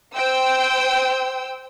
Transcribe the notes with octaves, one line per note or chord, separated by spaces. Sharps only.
C5 G5 E6